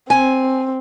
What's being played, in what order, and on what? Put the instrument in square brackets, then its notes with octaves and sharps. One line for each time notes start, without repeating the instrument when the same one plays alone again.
[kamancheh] C4 [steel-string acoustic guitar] G#5